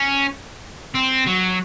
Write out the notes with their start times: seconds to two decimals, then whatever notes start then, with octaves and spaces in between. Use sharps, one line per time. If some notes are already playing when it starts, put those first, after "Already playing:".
Already playing: C#4
0.94 C4
1.26 F#3